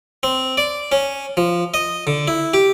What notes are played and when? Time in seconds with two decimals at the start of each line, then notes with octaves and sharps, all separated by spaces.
0.23 C4
0.57 D5
0.92 C#4
1.37 F3
1.74 D#5
2.07 D3
2.28 E4
2.54 G4